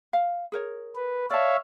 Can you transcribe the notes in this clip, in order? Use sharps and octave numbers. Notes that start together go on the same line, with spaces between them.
F5
G#4 A#4 C#5
B4
C#5 D5 E5 F5 A5